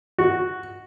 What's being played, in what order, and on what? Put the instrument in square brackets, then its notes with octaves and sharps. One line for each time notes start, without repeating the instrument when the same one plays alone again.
[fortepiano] F#4